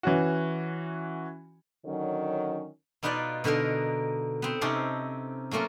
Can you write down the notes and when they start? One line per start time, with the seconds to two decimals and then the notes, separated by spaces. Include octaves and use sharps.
0.03 E3 C#4 F#4
1.85 D3 D#3 F#3 C#4
3.03 B2 B3 D#4 F4 B4 D5
3.44 B2 D3 B3 D#4 A#4
4.42 B3 C4
4.61 C3 C#4 D#4 G4 A4 C6
5.51 F#3 A3 A#3 C#4 F4